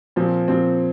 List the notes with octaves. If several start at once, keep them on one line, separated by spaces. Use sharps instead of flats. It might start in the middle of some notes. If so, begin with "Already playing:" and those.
A#2 F3 C4
A#2 F3 C4